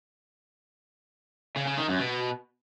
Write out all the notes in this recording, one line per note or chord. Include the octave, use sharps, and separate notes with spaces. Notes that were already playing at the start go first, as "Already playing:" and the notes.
C#3
C#3
D#3
F#2
B2